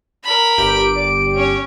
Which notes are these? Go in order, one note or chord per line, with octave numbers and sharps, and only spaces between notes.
A#4 B5
G1 G4 D7
D5
C#4 C#5